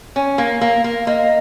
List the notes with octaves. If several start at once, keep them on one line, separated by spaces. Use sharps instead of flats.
C#4
A#3
A#3
A#3
A#3 D#5